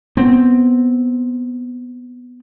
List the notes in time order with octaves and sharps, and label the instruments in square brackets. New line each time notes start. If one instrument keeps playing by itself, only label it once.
[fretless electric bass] B3 C4